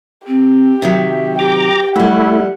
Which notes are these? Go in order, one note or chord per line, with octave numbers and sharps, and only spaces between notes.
C4 G4
C3 D#3 F#3 E5
G4 G5 A#5 D6
F3 G3 A3 E4 F#5